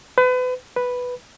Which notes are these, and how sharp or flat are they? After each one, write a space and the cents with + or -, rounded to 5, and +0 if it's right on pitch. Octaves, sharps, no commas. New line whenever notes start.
B4 +35
B4 +0